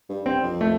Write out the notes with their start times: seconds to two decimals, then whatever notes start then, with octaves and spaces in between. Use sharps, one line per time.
0.09 G2
0.26 G2 C4
0.43 F2
0.61 A3